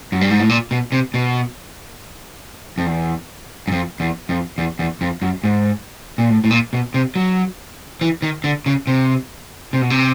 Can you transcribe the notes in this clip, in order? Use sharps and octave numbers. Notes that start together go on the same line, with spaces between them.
F#2
G2
G#2
A2
A#2
B2
C3
B2
F2
E2
F#2
F2
E2
F2
E2
E2
F2
F#2
G#2
A#2
A2
A2
A#2
B2
C3
F#3
E3
D#3
D3
C#3
C3
C3
B2
C3